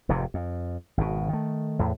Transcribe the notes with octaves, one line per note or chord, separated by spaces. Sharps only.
F1 F2 G#2 C3
F2
G#1 B2
D#3 A3
E2 A2